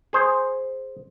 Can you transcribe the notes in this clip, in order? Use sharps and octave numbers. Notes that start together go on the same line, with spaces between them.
G#4 C5